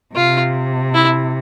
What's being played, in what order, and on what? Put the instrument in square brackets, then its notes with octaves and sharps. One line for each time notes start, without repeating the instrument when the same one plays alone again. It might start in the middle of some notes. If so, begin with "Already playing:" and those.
[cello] C3 [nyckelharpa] F4
[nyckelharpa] E4